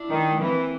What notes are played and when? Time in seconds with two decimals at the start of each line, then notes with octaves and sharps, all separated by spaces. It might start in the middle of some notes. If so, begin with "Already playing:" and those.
Already playing: D4 E4
0.10 D#3
0.41 E3 A#3 C4